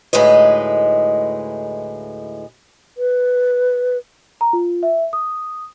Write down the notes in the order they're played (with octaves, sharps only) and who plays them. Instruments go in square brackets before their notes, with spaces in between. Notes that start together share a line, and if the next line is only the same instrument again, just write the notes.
[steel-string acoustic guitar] D2 A2 G#3 D#4 B4 D#5
[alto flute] B4
[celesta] A#5
F4
E5
D#6